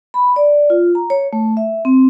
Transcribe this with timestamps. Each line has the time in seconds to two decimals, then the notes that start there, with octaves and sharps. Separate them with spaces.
0.14 B5
0.36 D5
0.70 F4
0.95 A#5
1.10 C#5
1.33 A3
1.57 E5
1.85 C4